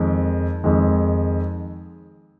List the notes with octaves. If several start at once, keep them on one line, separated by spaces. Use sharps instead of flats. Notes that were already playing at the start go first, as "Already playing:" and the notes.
Already playing: F2 D#3 G#3
F2 D#3 G#3